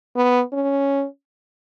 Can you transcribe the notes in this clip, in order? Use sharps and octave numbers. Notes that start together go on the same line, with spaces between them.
B3
C#4